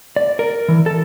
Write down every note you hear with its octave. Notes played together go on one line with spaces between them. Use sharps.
D5
A#4
E3
A4